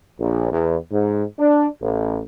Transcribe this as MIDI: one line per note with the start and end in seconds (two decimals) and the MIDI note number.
0.19 0.49 34
0.51 0.75 40
0.90 1.22 44
1.38 1.67 62
1.81 2.20 33